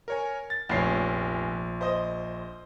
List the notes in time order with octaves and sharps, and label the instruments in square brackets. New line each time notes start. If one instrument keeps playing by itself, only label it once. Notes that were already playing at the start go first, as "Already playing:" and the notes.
[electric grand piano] A#4 C#5 G#5
A6
[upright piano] F1 C#4 C#5 [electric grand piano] A#1 C7
[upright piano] C5 D#5